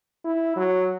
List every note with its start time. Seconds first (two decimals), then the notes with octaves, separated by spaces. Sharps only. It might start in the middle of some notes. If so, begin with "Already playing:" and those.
0.25 E4
0.57 F#3